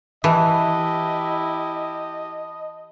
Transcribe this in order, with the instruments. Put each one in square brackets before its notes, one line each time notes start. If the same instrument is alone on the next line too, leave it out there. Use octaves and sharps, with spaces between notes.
[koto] E3 [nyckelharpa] E4 G4 [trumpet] D#5 [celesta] A5 F#6